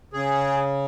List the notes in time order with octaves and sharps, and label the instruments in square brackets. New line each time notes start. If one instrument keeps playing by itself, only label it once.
[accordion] C#3 G#4